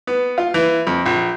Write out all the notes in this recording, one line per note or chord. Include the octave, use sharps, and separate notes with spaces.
B3
F4
E3
F2
A#1